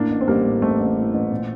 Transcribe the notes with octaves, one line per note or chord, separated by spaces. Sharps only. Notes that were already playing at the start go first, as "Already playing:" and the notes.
Already playing: A2 A#3 D4
A1
C4
A1 G3 A#3
A2
A1 A3 C4
A1
A2
A1
A#2